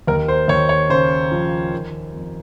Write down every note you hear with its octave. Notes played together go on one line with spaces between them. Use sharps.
D#2 A#4
C5
D#2 C#5
C#5
C#3 C5
F3
D#3
F2